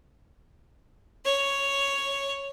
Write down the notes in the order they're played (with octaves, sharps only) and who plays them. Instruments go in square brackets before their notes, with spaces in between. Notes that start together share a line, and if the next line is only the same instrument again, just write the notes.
[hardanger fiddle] C#5